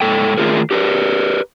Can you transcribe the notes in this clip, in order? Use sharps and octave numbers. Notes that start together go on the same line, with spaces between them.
G#2 A4 G5
D#3 A3 F4 G#4 A#4
G4 A#4 B4